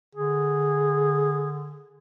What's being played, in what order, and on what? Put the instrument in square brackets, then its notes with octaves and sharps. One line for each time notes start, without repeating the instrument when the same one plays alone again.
[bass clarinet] D3 [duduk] G#4